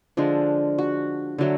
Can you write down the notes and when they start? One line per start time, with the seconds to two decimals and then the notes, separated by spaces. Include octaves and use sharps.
0.17 D3 F3 G#3 D4
0.78 F#4
1.38 D3 F#3 A3